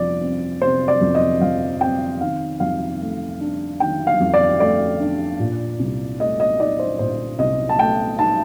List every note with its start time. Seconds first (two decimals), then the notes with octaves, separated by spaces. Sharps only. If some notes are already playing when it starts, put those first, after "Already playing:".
Already playing: F2 C3 F3 D5
0.21 C4
0.61 C3 C5
0.88 D5
1.01 F2
1.15 D#5
1.41 F3 F5
1.81 C4 G5
2.21 D#3 F5
2.60 F2 F5
3.00 A3
3.41 D4
3.80 D#3 G5
4.07 F5
4.20 F2
4.34 D5
4.60 A3 D5
5.00 D4
5.40 A#2
5.79 C2
6.20 A3 D#5
6.40 D#5
6.59 D#4 D5
6.79 C5
6.99 A#2 C5
7.39 C2 D#5
7.69 A5
7.79 A3 G5
8.19 D#4 A5